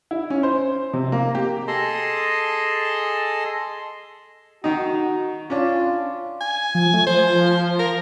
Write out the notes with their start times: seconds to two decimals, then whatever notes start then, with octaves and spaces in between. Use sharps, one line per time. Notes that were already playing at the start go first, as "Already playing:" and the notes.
0.11 E4
0.30 C#4
0.43 C5
0.93 C3
1.12 A#3
1.35 G4
1.68 G#4 A4 D#5 A5 C6
4.64 D#3 D#4 F#4
5.50 C#4 D4 F4
6.41 G#5
6.75 F3
6.93 A3
7.07 F3 C5
7.79 A#4